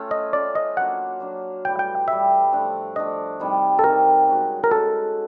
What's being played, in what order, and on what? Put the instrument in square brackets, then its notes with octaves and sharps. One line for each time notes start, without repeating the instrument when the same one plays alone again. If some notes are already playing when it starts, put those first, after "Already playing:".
Already playing: [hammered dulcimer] A3 C#4 F4
[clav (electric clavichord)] D#5
[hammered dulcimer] A3 C#4 F4 [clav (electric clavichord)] D5
[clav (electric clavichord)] D#5
[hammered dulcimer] F#3 A#3 D4 [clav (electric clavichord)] F#5
[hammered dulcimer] F#3 A#3 D4
[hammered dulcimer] A2 E3 G3 [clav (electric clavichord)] G5
[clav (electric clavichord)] G5
[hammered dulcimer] A2 E3 G3 [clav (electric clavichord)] E5
[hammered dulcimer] F3 A3 D4
[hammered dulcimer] F3 A3 D4 [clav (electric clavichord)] D#5
[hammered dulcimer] C3 D#3 G3
[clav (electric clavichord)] A4
[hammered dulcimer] C3 D#3 G3 [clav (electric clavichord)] A#4
[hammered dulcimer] G#3 C#4 F#4
[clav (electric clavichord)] A#4
[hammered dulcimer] G#3 C#4 F#4 [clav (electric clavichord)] A4